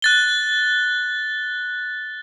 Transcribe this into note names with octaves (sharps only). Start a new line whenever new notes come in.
F#6 A6 G7